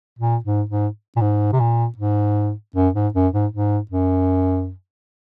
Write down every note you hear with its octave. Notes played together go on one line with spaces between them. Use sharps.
A#2
G#2
G#2
A#2
G#2
C3
A#2
G#2
F#2
G#2
F#2
G#2
G#2
F#2